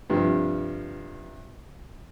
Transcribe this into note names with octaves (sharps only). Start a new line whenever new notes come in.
G2 C3 F3 G3